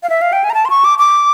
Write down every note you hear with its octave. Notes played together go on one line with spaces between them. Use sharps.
F5
E5
F5
G5
G#5
A#5
A5
C6
C#6
D6
D6